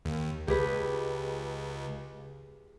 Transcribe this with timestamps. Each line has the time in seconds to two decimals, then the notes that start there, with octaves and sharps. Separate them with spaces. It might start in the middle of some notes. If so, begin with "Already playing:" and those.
0.05 D#2
0.47 C#2 G4 G#4 B4